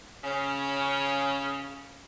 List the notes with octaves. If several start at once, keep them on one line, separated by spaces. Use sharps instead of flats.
C#3 C#4